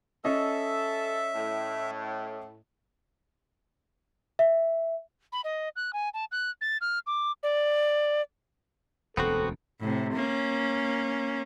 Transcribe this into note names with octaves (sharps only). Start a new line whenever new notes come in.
C#4 A4 D#5 E5
A2
E5
B5
D#5
F#6
G#5
A5
F#6
A6
F6
D6
D5
E1 D2 B3 C4 F#4 A4
A2 C3
A#3 C#4